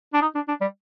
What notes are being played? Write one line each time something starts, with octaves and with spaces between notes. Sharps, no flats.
D4
D#4
D4
D4
G3